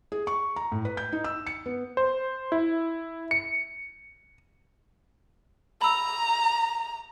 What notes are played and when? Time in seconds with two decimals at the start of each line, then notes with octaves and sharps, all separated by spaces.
0.12 G#4
0.27 C#6
0.56 A#5
0.72 A2
0.85 B4
0.97 G6
1.12 D#4
1.24 E6
1.47 C#7
1.66 B3
1.97 C5
2.52 E4
3.31 C#7
5.81 A#5 B5 E6